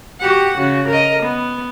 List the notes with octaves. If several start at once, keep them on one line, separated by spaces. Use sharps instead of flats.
F#4 G4 F#5
C#3 F#4
A#4 D#5
B3